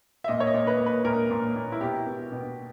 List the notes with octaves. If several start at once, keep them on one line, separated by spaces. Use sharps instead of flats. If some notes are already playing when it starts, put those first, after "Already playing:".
E5
A#2 D#5
C#5
D#5
A#2
B4
A#2
B4
A#2 A#4
A#2
A#2
E4
B2 G4
B2
B2